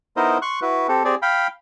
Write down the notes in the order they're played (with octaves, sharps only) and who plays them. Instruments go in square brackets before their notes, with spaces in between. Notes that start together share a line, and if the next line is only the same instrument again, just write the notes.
[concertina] B3 D#4 E4 A#4 C5 D#5
C6 C#6 F#6
E4 F#4 B4
C4 G4 A4
C4 G4 G#4 D5
F5 G5 B5